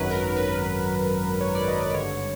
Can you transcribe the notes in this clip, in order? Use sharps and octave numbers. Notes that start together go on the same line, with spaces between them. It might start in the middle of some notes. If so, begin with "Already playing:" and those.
Already playing: G#1 F#2 D#3 F#3 B4
A#4
B4
C#5
D5
D#5
D5
G#1 G2 D3 C#5